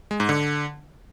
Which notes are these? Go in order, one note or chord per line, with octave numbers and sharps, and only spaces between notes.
G#3
G#2
D3